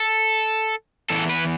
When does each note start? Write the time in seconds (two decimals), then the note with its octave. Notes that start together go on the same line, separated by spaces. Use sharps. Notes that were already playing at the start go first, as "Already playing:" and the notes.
Already playing: A4
1.10 E2 E3 A4
1.29 B4